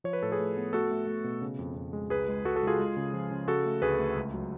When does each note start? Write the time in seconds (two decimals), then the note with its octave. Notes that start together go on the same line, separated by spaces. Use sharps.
0.04 F3 C#5
0.13 B4
0.23 A2 A4
0.32 G#4 B4
0.39 A2
0.57 B3
0.73 A3 F#4 A4
0.91 A3
1.07 A3
1.24 B2
1.41 C#3
1.59 F2
1.76 F2
1.93 G#3
2.10 C#2 G#4 B4
2.29 G#3
2.45 C#2 F#4 A4
2.56 F#4 A4
2.63 C#2 F4 G#4
2.79 G#3
2.97 C#3
3.13 F3
3.31 C#3
3.48 C#3 F#4 A4
3.66 A3
3.82 D2 G#4 B4
3.99 A3
4.16 C#2
4.34 F#3